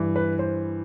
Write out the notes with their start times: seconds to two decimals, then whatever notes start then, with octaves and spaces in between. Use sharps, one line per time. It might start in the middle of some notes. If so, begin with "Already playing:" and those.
Already playing: G2 E3
0.16 B4
0.39 C5